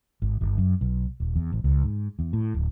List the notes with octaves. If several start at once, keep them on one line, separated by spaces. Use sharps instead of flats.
G#1
G1
F#2
B1
D#1
E2
A1
C#2
G#2
E2
A2
D1